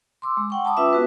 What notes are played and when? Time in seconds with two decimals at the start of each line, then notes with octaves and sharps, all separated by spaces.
0.22 C6 D6 E6
0.37 G#3
0.50 F#5 G5 C#6
0.65 A5 B5 D6 D#6
0.76 C#4 F4 B4 E5 D6 E6
0.93 B3 F#4 B4